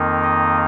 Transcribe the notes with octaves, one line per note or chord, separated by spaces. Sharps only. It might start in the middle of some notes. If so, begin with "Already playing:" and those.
Already playing: F2 D#3 A#3 D#4
D#5